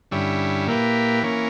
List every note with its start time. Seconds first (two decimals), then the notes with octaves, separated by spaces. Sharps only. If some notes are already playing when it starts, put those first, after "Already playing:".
0.11 G2 D3 G3 C#4 E4
0.67 A#2 A#3 E4 G4 B4
1.22 E3 A#3 C#4